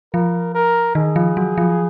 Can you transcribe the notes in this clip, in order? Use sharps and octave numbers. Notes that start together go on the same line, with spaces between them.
F3 A#4
A#4
D#3 G#4
F3
F#3
F3